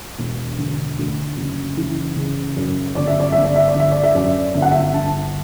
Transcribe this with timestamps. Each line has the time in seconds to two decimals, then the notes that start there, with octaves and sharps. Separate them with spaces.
0.18 E1
0.58 D3
0.99 D2
1.38 F#1
1.77 E3
2.17 C#3
2.56 F#2
2.95 G1 D5
3.07 E5
3.20 D5
3.32 G1 E5
3.44 D5
3.56 E5
3.68 D5
3.75 D3
3.80 E5
3.91 D5
4.04 E5
4.15 F#2 D5
4.55 G1 E5
4.62 F#5
4.72 E5
4.94 G1 A5